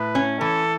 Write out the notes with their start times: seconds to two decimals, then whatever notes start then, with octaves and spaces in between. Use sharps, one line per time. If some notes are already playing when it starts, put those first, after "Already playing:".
Already playing: A2 B4
0.15 C#4
0.41 E3 A4